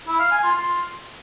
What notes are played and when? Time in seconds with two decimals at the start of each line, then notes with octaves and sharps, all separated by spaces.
0.08 E4
0.20 F5
0.31 G#5
0.43 F4
0.55 F4